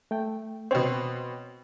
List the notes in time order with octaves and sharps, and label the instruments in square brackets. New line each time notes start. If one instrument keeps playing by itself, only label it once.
[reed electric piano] A3 G5
[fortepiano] B2 C4 [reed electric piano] C5 C#5 G5